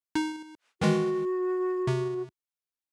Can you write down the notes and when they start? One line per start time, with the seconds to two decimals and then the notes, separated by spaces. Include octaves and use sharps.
0.15 D#4
0.81 D#3 E3 G#3 F#4
1.87 C3